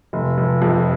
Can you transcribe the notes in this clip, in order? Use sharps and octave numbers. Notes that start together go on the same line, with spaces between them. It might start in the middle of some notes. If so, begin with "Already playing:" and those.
F1
F1
F2